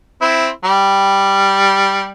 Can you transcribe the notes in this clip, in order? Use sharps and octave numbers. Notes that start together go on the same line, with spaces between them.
C4 E4
G3